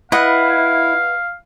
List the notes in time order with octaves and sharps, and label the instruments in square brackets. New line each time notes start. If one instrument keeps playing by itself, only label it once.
[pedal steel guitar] E4 [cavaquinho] B4 D#5 F#5 [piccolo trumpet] F5